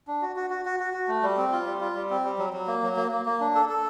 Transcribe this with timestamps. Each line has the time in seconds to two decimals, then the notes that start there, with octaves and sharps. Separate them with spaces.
0.08 D4
0.22 F#4
0.36 F#4
0.50 F#4
0.65 F#4
0.80 F#4
0.94 F#4
1.08 A3
1.23 G3
1.37 C4
1.52 F4
1.66 G3
1.81 F4
1.95 G3
2.10 C4
2.24 G3
2.38 F#3
2.53 F#3
2.67 A#3
2.83 F#3
2.97 A#3
3.11 A#3
3.26 A#3
3.40 D4
3.55 A4
3.69 A4